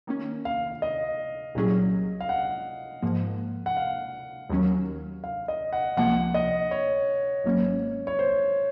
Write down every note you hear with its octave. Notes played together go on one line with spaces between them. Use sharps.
D#3 A#3 C#4
F5
D#5
C2 A#2 F#3 C#4 G#4
F5
F#5
G#2 F3 A#3
F#5
F5
D#2 D#3 F#3 C#4
F5
D#5
F#5
C#2 C3 F3 A#3 F#5
D#5
C#5
G#1 G#2 F#3 A#3 C#4
C#5
C5